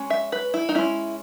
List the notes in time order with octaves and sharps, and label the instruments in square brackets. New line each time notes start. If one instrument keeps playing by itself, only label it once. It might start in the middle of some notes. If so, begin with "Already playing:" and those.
Already playing: [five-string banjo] G#3 C#4
E5
B4
E4
D#4
G#3 C#4 E4